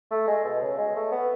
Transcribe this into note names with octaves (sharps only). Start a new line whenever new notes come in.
A3
G#3
B2
C#3
G#3
A3
B3